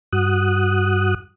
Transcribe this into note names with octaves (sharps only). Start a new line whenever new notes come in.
G2 F#4 D#6 F#6